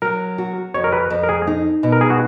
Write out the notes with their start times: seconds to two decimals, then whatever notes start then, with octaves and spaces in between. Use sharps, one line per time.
0.02 F#3 A#4
0.38 F#4
0.74 F2 C#5
0.84 A#4
0.92 B4
1.10 F2
1.23 A#4
1.29 G#4
1.47 D#4
1.83 B2
1.92 A#4
2.01 G#4
2.10 F#4